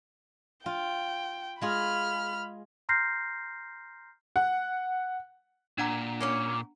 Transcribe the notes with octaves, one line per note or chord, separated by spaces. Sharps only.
F4 G5
G#3 F4 G#4 B5 F6
A#5 C6 F6 G6 A#6 C7
F#5
A#2 D4 F#5 A#5
A#3 C#4 C#5 D6